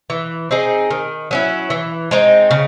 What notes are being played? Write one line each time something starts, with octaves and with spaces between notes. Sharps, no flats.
E3
C4 D#4 G#4
D#3
F#3 C#4 E4
E3
G#3 C4 D#4
C#3